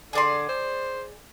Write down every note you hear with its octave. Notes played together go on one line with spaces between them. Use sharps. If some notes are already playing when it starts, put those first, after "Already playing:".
D3 G#4 D5 C6
C5